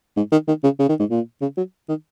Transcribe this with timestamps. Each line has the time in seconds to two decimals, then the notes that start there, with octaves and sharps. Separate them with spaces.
0.17 G#2
0.32 D#3
0.48 D#3
0.64 C#3
0.79 C#3
0.89 D#3
0.99 G#2
1.10 A#2
1.41 C#3
1.57 F#3
1.89 D#3